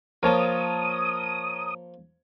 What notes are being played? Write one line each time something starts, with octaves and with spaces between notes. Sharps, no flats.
F3 A#3 F4 A#4 C#5 A5 D#6